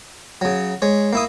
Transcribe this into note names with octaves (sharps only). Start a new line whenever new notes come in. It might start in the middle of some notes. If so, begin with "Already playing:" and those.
C#3 F#3
G#3 C#5
A#3 E4 D#6